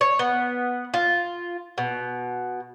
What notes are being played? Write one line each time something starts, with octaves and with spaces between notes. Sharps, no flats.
C#5
B3
F4
B2